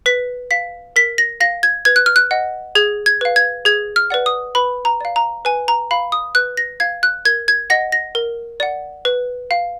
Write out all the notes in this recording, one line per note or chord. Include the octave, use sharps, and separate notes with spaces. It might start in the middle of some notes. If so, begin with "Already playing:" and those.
B4 B6
F5 B6
A#4 B6
A#6
F5 A#6
G#6
B4 G#6
F#6
F6
F#6
D#5 F#5
G#4 G#6
G#6
B4 F5
G#6
G#4 G#6
F6
B4 D5 F#5
D#6
B4 B5
A#5
D5 F5
A#5
B4 G#5
A#5
F5 B5
D#6
B4 F#6
A#6
F5 G#6
F#6
A#4 G#6
G#6
D#5 F#5 A#6
A#6
A#4
D5 F#5
B4
F5